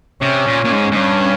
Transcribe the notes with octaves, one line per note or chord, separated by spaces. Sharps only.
C3 C#4
A#2
A#2
G#2
G#2
G2 C#4